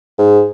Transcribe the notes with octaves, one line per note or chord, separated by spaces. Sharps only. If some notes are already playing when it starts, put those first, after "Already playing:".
G#2